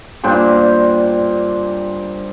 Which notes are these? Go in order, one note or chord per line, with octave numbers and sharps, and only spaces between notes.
G2 A#2 C5 G5